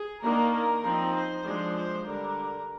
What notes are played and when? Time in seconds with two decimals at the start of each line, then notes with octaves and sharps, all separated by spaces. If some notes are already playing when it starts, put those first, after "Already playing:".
Already playing: G#4
0.23 D#3 A#3 D4 A#4
0.54 A#4
0.84 F3 C4 D#4
1.15 C5
1.45 F3 G#3 D4
1.76 C5
2.06 D3 G3 D4 A#4